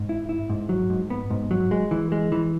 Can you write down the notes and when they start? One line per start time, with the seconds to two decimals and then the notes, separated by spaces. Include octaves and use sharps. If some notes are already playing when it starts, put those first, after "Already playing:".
Already playing: G#2
0.09 E4
0.29 E4
0.50 G#2
0.69 F#3
0.90 G#2
1.10 B3
1.30 G#2
1.51 F#3
1.71 G#3
1.91 E3
2.12 G#3
2.32 E3